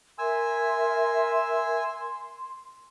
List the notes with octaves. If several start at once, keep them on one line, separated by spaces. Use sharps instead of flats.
A#4 E5 G#5 C6 E6